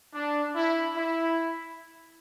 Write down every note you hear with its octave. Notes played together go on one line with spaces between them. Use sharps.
D4
E4
E4